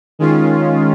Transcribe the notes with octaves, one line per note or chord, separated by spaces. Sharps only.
D#3 G#3 C#4 F4